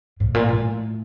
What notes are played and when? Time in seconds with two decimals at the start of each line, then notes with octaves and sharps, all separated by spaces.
0.20 A2
0.34 A#2
0.49 A2